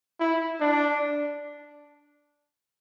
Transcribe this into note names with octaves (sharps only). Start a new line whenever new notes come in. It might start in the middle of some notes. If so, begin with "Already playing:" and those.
E4
D4